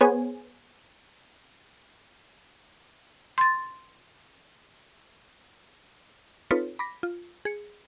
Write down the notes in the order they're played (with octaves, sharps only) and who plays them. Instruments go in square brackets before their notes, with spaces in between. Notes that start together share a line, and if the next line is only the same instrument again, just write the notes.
[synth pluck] B3 G#4 C5 C#5 G#5
[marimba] C6 A6
[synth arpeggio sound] C4 D#4 F4 A4 B4 C#5
B5 D6 A#6 B6
F4
G#4 C#7